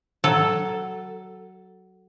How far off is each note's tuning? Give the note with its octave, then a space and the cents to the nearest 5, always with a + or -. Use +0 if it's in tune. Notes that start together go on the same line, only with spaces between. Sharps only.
F#3 +15 A4 +0